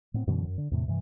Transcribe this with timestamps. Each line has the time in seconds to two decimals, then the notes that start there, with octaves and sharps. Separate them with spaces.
0.14 A2 B3 C4
0.27 F#2 B2 D3 E3
0.45 F#2
0.58 D3
0.71 E2 A2 C3
0.88 G2 C3 E3